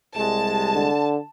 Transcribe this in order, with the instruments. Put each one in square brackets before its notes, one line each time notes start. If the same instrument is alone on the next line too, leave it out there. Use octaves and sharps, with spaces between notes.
[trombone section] C2 G3 G#3 [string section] A5
[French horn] D3